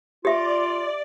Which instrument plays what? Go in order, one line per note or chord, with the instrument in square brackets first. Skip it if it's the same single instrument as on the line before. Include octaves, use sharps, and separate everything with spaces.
[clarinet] F4 [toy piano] G4 E5 [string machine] D5